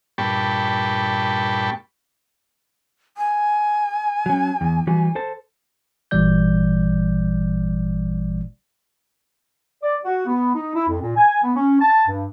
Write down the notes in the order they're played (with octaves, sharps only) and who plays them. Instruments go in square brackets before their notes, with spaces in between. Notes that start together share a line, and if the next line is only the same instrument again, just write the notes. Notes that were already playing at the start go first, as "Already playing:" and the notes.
[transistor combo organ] G2 A#2 G5 A5 B5 C#6
[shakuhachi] G#5
[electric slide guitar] F#3 C#4
E2
E3 G3 F#4
A4 C5 A5
[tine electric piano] G#1 A#2 E3 G3 D5 G6
[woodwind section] D5
F#4
B3
D#4
E4
F2
A#2
G#5
B3
C#4
A5
G2